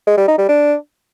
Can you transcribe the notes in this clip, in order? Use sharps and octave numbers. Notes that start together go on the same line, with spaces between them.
G#3
G3
D#4
G3
D4